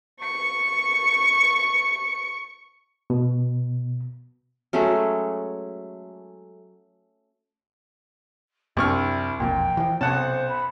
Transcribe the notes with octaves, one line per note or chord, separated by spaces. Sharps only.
C#6 C#7
B2
F#3 G#3 A3 C#4
C2 F#2 B3 D4 E4 C#6 F6
E1 A#1 F2 A#2 G5
E3 F3
B1 C3 C#4 C#5 F#5 A5
C5
B5